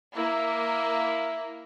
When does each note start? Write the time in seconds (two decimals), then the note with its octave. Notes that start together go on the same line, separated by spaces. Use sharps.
0.16 A#3 E4